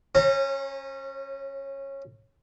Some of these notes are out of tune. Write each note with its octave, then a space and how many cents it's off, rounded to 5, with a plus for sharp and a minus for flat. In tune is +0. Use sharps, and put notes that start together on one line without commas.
C#4 -20 C#5 -45 A#5 -30